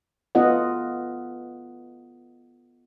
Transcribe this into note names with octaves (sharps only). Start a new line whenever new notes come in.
B3 F4 A4 D#5 F#5